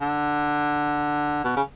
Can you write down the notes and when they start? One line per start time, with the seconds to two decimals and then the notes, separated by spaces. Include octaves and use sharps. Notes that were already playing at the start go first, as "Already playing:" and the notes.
0.01 D3
1.44 B2
1.56 C#3